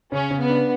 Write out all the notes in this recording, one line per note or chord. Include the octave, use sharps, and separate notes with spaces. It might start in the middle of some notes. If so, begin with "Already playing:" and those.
C#3 C#4
C#3
B3
D4